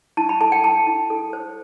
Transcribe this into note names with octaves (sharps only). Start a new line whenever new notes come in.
E4 A5
B5
A4 A5
G5
E4 A5
E4
A4
C5